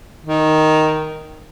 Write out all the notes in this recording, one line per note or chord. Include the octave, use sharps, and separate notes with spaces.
D#3